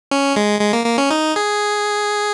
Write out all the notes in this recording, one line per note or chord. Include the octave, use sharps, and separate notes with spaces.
C#4
G#3
G#3
A#3
A#3
C#4
D#4
G#4